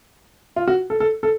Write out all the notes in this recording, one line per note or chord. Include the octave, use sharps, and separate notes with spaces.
F4
F#4
A4
A4
A4